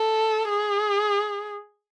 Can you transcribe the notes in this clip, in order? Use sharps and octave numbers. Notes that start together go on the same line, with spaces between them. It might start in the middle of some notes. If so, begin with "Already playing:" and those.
Already playing: A4
G#4